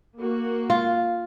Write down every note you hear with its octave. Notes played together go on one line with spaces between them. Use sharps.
A#3 F#4
F4